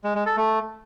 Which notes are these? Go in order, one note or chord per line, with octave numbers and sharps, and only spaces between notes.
G#3
G#3
A4
A3